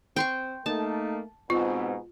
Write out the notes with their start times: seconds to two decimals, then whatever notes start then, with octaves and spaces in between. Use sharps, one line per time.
0.16 C4 G5 C6 C#6
0.66 A3 A#3 D#4 A5
1.50 G#2 B2 C4 F4